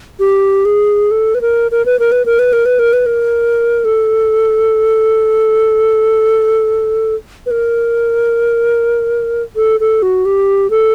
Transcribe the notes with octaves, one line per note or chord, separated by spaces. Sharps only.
G4
G#4
A4
B4
A#4
A#4
B4
A#4
B4
A#4
B4
A#4
B4
A#4
B4
A#4
A4
B4
A#4
A4
A4
F#4
G4
A4